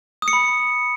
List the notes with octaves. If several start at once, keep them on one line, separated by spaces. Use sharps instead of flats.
D#6
C#7
B5